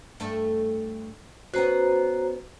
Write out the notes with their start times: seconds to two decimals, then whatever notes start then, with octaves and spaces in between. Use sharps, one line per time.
0.20 G2 A3 A4
1.54 B3 C#4 F#4 B4 C5 A#5